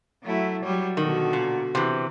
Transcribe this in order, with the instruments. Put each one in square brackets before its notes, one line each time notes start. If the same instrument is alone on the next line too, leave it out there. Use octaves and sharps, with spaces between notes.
[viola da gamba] F#3 A3 E4
F#3 G3 C#5
[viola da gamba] B2 D3 F#4 [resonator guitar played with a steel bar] D#3
[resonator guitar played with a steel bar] A#2
C3 E3